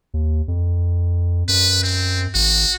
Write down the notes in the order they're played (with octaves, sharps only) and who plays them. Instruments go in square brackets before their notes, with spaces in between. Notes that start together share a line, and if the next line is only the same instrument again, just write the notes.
[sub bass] D#2
F2
[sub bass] F#2 [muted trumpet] B4
[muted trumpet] C4
[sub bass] G#1 [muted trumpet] F#4